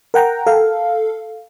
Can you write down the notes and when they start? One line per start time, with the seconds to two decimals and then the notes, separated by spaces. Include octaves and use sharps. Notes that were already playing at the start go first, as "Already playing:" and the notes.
0.14 A#4 F#5 G5 A#5
0.46 A4 F5